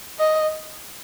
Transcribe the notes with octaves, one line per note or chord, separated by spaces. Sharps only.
D#5